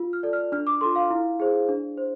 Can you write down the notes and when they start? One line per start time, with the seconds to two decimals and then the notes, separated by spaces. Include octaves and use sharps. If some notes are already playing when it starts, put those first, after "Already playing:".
Already playing: F4
0.13 F6
0.23 A4 D5
0.33 F6
0.52 D4 F6
0.67 D6
0.81 F4 A4 C6
0.96 F5
1.10 E4
1.40 G#4 C5
1.69 D4
1.98 C5